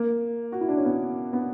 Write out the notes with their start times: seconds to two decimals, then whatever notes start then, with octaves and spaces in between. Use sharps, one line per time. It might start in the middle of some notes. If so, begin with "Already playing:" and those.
Already playing: A#3
0.52 F#4
0.61 E4
0.69 D4
0.77 C#4
0.85 B3
1.33 B3